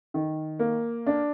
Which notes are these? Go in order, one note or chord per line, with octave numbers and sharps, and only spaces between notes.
D#3
A#3
D4